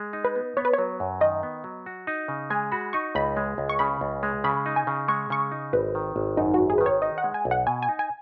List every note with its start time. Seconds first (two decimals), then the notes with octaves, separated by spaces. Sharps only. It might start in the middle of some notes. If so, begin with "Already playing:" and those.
Already playing: G#3
0.13 D#4
0.25 B4
0.36 B3
0.57 B3 C#5
0.65 B4
0.73 F#3 C#5
1.00 F#2
1.21 D#3 D#5
1.43 B3
1.64 F#3
1.86 F#4
2.07 D#4
2.28 C#3
2.50 G#3 G#5
2.72 F#4 B5
2.93 D#4 C#6
3.15 C#2 B5
3.37 G#3
3.58 C#2
3.69 C#6
3.79 C#3 B5
4.01 C#2
4.23 G#3
4.44 C#3 B5
4.66 D#4
4.76 G#5
4.87 C#3
5.08 G#3 C#6
5.30 C#3 C#6
5.51 D#4
5.73 G#1 B4
5.95 D#3
6.16 G#1
6.37 F#2 D#4
6.54 G#1 F#4
6.70 G#4
6.78 D#3 B4
6.86 C#5
7.02 D#4 D#5
7.18 F#5
7.24 G#3
7.34 G#5
7.45 B1
7.51 F#5
7.67 B2 G#5
7.83 G#5
7.89 D#4
7.99 G#5